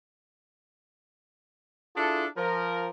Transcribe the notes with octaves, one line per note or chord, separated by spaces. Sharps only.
D4 E4 F4 G#4 A4
F3 A#4